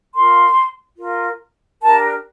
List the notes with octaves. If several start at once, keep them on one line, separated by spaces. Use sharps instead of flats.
F4 A#4 C6
F4 A#4
D4 G4 A#4 A5